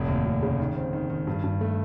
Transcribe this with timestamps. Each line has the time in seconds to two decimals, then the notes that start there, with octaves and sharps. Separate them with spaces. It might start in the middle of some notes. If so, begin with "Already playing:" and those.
Already playing: F1 A2
0.08 D#2
0.25 F1
0.42 C#3
0.60 D#3
0.76 C4
0.93 D#3
1.10 D#3
1.27 G2
1.44 G2
1.61 A3